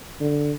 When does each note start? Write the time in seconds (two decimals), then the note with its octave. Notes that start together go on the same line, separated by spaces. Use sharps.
0.21 D3